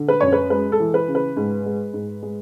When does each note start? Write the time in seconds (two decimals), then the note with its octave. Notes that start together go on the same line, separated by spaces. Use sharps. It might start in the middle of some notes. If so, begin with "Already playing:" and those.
Already playing: D3
0.08 B4
0.20 F#2 C#5
0.32 B4
0.50 G#3 B4
0.72 A4
0.80 E3
0.94 B4
1.08 C#3
1.15 B4
1.37 G#2
1.66 G#3
1.93 G#2
2.23 G#3